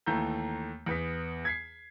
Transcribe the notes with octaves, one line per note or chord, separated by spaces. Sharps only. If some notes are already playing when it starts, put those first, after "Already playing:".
D#2 E3 A3 A#5 G6
E2 B3 B6
G#6 B6 C7